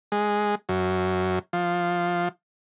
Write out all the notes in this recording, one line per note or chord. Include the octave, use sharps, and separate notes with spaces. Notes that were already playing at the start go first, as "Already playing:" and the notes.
G#3
F#2
F3